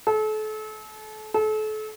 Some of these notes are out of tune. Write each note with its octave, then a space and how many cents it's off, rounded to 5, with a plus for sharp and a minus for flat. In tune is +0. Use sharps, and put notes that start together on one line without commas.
A4 -35
A4 -35